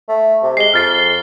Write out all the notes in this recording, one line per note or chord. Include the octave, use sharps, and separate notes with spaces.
A3
C3
G#3 C7 G7
F2 F6 A6 C7